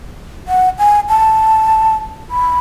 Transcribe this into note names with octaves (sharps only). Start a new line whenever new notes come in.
F#5
G#5
A5
B5